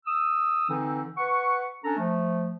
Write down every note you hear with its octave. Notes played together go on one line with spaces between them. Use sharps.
D#6 E6
D3 E3 C4 D#4
B4 F#5 C#6
C#4 D4 A4 A#5
F3 A3